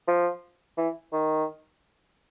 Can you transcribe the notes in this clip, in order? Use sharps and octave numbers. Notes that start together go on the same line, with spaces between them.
F3
E3
D#3